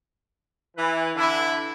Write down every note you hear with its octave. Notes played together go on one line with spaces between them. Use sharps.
E3 B4
D3 E4